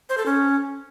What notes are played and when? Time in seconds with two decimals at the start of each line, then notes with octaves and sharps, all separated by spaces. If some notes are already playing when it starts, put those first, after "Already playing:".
0.09 C5
0.18 A4
0.26 C#4